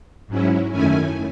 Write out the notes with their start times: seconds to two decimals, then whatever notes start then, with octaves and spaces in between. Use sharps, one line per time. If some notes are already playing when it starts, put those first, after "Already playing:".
0.27 G#2 F#3 C#4 E4
0.71 F#2 D#3 A3 C#4 E4 G#5